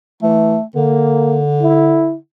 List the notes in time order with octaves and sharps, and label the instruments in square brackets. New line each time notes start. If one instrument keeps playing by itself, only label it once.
[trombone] E3 [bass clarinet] A3
[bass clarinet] D3 [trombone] A#3
[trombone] E4